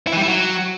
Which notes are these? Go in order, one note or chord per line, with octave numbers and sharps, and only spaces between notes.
E4
E3
G3
E4
F#3